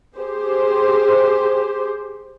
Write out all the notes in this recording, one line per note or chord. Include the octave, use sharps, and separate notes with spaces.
G4 G#4 C5